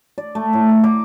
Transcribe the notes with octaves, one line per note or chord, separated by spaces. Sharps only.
D5
A3
A2
A#5
D6